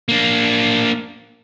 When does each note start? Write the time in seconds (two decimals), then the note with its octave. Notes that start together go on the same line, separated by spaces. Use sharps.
0.09 A#3 D4